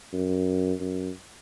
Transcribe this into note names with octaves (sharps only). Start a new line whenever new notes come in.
F#2
F#2